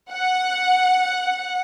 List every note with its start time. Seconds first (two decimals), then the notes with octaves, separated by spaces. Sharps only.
0.11 F#5